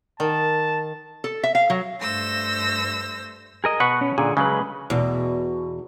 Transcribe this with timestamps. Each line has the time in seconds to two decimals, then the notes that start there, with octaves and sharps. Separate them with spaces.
0.20 D#3 A5
1.24 A4
1.43 E5
1.55 F5
1.70 F#3
2.01 G2 A3 C5 E6 A#6
3.64 G#4 A#4 D#5
3.80 B2 F#4 B4 F#5 C#6
4.01 C#4
4.18 A#2 D3 G#4
4.37 C#3 F#3 G#3 B4
4.90 E2 B2